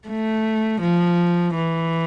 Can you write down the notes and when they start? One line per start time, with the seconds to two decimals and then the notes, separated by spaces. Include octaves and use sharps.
0.08 A3
0.81 F3
1.55 E3